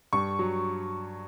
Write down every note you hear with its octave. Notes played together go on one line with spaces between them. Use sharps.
G2 C#6
F#3